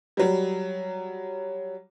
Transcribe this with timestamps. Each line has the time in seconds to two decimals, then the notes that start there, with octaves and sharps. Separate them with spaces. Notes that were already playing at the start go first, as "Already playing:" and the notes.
0.17 F#3 G3